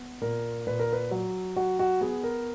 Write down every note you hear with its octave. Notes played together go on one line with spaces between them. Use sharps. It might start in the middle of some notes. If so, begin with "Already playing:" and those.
Already playing: B3
A#2 A#4
A#2 B4
A#4
B4
F#3
F#3 F#4
F#4
B3 G#4
A#4